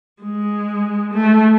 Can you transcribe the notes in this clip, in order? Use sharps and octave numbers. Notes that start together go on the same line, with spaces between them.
G#3
A3